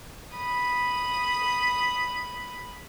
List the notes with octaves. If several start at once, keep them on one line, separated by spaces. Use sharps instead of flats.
B5 D#6